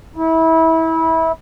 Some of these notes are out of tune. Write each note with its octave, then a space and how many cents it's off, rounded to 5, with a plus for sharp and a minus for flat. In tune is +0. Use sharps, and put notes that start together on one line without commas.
E4 -25